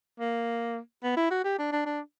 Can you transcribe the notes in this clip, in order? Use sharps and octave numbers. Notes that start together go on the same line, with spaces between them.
A#3
B3
E4
F#4
G4
D4
D4
D4